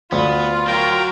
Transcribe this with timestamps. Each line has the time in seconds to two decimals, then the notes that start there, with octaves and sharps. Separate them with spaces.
0.12 D2 B3 F4
0.67 F#3 A#4 G5